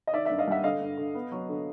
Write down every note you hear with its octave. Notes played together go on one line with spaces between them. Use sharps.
D#5
D#3 D5 E5
D5 E5
G2
D#5 F5
G3 E5 F#5
D3 D#5 F5
G2
D3
B3
F#3
D3